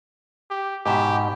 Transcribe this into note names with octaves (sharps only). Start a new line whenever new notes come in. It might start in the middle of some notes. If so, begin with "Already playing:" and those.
G4
G#2 B2 G4 E5